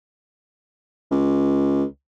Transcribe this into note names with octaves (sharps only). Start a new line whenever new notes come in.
C#2